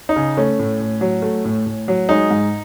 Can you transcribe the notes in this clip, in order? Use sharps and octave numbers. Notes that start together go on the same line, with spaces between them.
D#4
C#3
A3 C#4
A2
A2
F#3
A3
A2
A2
F#3
G#3 D#4
G#2